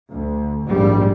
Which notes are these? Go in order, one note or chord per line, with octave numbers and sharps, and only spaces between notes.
D2
A#1 G#2 G3